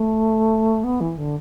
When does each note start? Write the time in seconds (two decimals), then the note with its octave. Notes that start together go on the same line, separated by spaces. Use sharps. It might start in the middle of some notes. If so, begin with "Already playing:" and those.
Already playing: A3
0.84 B3
1.01 E3
1.17 D3